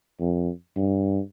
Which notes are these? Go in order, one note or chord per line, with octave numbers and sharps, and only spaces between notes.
F2
G2